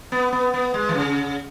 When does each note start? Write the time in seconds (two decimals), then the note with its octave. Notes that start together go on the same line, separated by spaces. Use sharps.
0.12 B3
0.33 B3
0.54 B3
0.74 G#3
0.89 E3
0.95 C#3